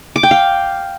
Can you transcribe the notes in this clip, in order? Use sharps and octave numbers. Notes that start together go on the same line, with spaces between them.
D6
G5
F5